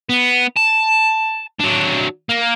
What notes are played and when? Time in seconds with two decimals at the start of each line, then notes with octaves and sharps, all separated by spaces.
0.09 B3
0.57 A5
1.59 F#3 D4
2.29 A#3